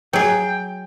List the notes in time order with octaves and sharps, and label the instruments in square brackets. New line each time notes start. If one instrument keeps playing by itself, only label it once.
[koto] F#3 G#4 [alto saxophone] G5